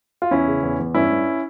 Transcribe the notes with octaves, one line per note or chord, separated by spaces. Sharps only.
F4
E2 C#4 E4
C#3
E2
E2
G2 C#4 E4
G2